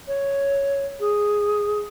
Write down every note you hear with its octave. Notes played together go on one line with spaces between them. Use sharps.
C#5
G#4